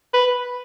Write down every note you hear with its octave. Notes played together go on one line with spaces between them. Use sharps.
B4